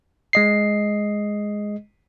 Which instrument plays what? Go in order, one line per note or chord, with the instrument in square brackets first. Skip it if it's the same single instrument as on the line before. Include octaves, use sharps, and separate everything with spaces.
[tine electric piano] G#3 D#5 C7